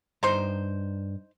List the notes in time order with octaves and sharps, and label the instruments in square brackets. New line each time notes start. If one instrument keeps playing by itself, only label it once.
[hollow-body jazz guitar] G2 D5 A#5 [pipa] D#4 C5